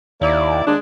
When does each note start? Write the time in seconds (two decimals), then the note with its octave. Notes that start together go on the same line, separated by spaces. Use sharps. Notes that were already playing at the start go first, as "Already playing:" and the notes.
0.21 D#2 A#3 E4 D5
0.67 D#2 G#3 D4